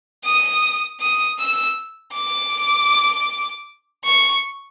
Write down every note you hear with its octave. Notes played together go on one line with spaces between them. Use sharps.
D#6
D#6
E6
D6
C#6